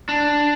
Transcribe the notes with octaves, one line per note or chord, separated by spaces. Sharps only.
D4